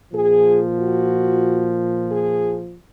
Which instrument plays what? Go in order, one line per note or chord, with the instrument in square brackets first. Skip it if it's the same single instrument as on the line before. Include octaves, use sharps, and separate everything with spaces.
[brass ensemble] A#2 F3 G#4
F#4
G#4